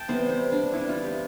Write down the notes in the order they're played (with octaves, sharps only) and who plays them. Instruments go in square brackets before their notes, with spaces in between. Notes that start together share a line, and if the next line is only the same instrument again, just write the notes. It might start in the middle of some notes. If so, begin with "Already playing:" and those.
Already playing: [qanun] G5 A5
C3 E3 G3 B3 C5
C5
D4
C3 E3 G3 B3 E4
F4
G4